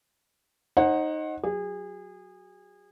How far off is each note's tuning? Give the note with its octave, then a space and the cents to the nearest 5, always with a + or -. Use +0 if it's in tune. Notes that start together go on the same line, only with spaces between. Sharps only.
D#4 +0 C5 +40 F#5 +0
F#3 +0 G#4 -30